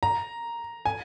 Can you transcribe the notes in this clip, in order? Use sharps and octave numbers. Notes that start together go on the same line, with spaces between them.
A#5
G#5